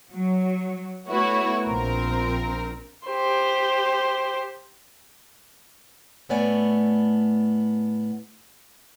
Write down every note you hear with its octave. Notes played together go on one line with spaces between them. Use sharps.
F#3
A3 B3 E4 F#4 C#5
A#1 C4 A#4
G4 C5
A2 A3 B3 C#5 D5 G#5